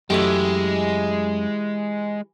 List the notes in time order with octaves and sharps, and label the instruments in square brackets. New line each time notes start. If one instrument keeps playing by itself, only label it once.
[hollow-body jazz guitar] F#2 A3 [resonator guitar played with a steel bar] E3 G4 [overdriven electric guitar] G#3